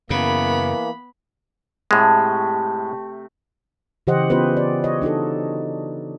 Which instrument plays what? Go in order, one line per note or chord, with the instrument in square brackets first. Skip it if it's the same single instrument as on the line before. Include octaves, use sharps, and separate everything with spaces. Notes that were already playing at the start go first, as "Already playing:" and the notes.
[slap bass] F#2 C#3 [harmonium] E3 A#3 [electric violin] B3 B5
[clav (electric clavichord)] A2 G#3 [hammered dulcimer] C3 A3
[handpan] C#3 E3 G4 C5 D#5 F#5
B3 C#4 F4 G4 B4 C5
D5
C#5 D#5
D4 D#4 F#4 A4